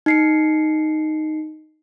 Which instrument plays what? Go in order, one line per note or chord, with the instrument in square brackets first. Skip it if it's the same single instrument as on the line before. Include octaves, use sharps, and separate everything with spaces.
[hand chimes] D#4 C7 C#7